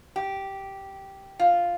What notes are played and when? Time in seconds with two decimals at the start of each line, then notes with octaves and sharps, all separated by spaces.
0.16 G4
1.39 F4